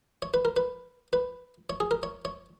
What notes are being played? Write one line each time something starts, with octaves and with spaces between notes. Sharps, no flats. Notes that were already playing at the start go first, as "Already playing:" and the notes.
C#5
B4
A#4
B4
B4
C#5
G#4
A#4
C#5
C#5